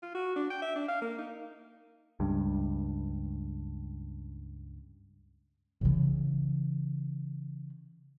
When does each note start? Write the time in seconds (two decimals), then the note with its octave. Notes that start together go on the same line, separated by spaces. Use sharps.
0.03 F4
0.15 F#4
0.36 D4
0.50 G5
0.62 E5
0.75 D4
0.89 F5
1.01 A#3
1.18 D#4
2.20 C#2 G2
5.81 C#3 E3